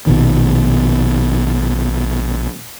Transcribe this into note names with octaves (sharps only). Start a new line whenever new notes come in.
A#1 B2 D#3